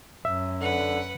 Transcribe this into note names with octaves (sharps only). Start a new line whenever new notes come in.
F#2 E5
D3 B4 F#5